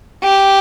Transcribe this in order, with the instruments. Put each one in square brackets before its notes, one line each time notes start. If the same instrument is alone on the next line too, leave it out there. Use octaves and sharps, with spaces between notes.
[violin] G4